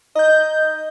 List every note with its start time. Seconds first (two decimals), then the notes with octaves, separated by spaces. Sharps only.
0.16 D#4 D#5 G6